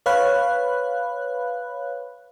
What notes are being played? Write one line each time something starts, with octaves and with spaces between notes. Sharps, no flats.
B4 C#5 F5 B5 F#6